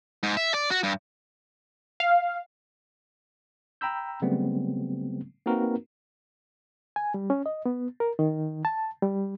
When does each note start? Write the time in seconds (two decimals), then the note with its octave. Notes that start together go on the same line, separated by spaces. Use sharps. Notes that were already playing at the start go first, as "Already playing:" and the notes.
0.23 G#2
0.37 E5
0.54 D5
0.71 F#4
0.83 G2
2.00 F5
3.81 G5 A#5 B5 E6 G6
4.22 C#3 F#3 G3 A3 B3 C4
5.46 A#3 C4 D#4 F#4 A#4 B4
6.96 G#5
7.14 G3
7.30 C#4
7.46 D#5
7.66 B3
8.00 A#4
8.19 D#3
8.65 A5
9.03 G3